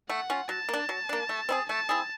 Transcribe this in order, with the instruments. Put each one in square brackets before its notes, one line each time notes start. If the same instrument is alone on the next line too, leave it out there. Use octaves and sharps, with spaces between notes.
[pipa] A3 [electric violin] F#5
[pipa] C#4 F4
[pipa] F#3 [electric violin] A5
[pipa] A#3 D4
F#3
A#3 D4
A3
C4 E4 G#4
[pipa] A3 [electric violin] A5
[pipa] C4 E4 G#4